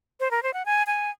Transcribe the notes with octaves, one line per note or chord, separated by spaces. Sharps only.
C5
A#4
C5
F#5
G#5
G#5